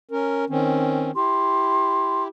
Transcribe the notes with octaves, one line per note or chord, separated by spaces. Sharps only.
C#4 A#4
D#3 C4 C#4
E4 G4 C6